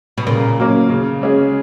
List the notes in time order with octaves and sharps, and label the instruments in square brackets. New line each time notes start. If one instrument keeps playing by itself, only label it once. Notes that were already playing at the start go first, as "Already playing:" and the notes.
[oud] B2
[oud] A#2 [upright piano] C#3
[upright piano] F#3 A#3 C#4
C#3
G#3 C#4 G#4